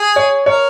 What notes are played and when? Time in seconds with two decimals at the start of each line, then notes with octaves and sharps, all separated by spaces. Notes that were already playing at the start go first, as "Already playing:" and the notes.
Already playing: G#4
0.16 C#5
0.46 A#4 C#5